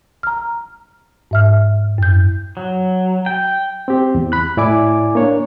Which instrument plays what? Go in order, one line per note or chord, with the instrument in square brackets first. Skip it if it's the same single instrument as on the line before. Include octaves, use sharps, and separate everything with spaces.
[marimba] A#5 F6
G#2 E5 F6
F#2 G6
[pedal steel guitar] F#3
G5
[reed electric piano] C4 G4
E2
B5 F#6
A2 E4 D5 G#5 D6
A#3 D4 C#5